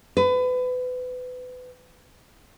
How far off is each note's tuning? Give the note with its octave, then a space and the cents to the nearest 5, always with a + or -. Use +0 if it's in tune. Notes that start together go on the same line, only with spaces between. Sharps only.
B4 +30